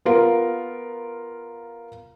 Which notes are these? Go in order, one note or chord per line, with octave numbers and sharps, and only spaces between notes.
B3 F4 A#4